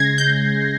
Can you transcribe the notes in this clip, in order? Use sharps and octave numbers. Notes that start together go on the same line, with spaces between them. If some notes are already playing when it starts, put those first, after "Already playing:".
Already playing: C#3 G#3 G#6 A#6 C7
G6